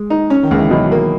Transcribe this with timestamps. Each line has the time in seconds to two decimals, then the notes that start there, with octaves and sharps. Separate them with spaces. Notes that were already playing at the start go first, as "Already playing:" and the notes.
Already playing: G#3
0.10 D#4
0.30 C#4
0.43 D#3
0.51 C#2
0.57 E3
0.70 B2 F#3
0.92 A#3